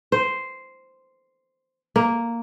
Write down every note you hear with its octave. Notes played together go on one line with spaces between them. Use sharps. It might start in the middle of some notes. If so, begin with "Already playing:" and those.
C5
A#3